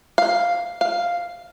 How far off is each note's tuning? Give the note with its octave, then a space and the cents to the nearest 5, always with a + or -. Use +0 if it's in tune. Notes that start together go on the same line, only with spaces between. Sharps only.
F5 +0
F5 +0